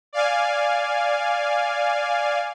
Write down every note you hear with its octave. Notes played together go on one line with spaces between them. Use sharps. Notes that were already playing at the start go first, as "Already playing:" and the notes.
D5 F5 G#5